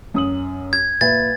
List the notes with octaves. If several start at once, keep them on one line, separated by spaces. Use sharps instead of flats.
F#2 D#6 F#7
G#6
A#2 B4 E5 A6